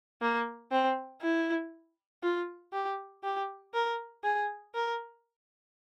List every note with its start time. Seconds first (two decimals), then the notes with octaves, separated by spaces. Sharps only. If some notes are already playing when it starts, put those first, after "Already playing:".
0.21 A#3
0.72 C4
1.21 E4
2.23 F4
2.73 G4
3.23 G4
3.74 A#4
4.23 G#4
4.74 A#4